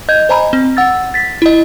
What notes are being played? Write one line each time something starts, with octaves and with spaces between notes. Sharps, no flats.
D#5 G6 G#6
C5 D#5 G#5 A#5 B5
C4
F#5 E6 A6
A6 B6
E4 D#5